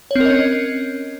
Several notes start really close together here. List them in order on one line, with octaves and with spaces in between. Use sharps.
C#5 C4 A#4 D#5 C#4